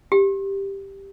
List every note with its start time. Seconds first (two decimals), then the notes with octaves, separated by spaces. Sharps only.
0.12 G4